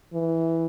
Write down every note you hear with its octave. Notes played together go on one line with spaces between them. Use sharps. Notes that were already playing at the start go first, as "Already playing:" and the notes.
E3